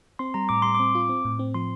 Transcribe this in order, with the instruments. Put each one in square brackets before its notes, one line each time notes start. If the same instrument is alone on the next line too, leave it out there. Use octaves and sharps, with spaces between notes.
[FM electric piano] C4 [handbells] C6
[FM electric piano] G3 [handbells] A#5
[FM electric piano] A2 [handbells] D6
[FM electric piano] G3 [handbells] C6
[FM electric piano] C4 [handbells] D6
[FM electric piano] F4
C4
A2
C4
[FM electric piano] F3 [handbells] C6